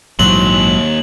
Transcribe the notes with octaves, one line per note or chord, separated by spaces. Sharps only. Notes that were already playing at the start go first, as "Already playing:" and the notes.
A#1 D#2 G#2 E3 F#3 C6 F#7